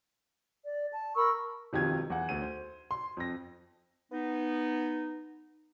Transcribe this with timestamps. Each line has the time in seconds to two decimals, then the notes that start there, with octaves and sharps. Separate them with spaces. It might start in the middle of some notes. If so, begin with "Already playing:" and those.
0.66 D5
0.93 A5
1.16 A#4 B5 C#6 E6
1.73 E1 F2 D#3 F4 G4 G#6
2.10 E2 F#5
2.29 D2 D#7
2.42 C5
2.91 C6
3.17 F2 A#6
4.12 B3 D#4